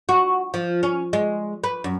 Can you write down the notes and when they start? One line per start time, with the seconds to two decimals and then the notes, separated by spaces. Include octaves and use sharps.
0.09 F#4
0.54 F3
0.83 C#4
1.13 G#3
1.64 B4
1.84 F#2